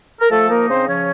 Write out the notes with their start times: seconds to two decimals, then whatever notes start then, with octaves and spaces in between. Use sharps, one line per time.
0.21 A#4
0.30 F3 A3 A4
0.49 A#3 D#4 A#4
0.68 C#3 C4 C5
0.87 F3 C#4 C#5